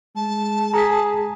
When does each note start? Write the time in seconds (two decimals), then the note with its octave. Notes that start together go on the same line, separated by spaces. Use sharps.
0.16 G#3 A5
0.74 G#4 A#5 B6